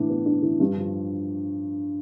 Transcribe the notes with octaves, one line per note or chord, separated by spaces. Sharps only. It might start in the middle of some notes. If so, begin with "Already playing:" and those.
Already playing: A2 E3 D4
B3
D4
E3
G2
F3